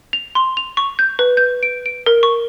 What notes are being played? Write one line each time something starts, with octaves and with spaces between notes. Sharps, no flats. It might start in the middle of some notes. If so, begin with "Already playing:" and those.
F7
C6
F7
C#6
G6
B4
G6
D7
D7
A#4
C#6